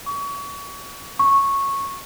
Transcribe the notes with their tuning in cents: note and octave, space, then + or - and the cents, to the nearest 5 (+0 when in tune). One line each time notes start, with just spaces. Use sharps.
C#6 +30
C#6 -10